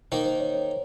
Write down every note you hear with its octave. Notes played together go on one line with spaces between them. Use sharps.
D#3 A#3 D#4 C5
C5
C#5
C#5